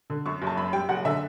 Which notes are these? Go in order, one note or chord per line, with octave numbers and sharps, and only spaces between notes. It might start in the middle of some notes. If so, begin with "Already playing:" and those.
D3
F#2 C#6
F#1
A5
F#2 B5
G3 G5
F#1 F#5
D3 E5